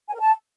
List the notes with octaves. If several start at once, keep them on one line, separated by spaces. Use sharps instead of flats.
G#5
A#4
A5